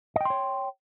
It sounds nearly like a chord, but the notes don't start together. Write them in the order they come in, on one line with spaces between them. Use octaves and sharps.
D#5 G5 C6 C#5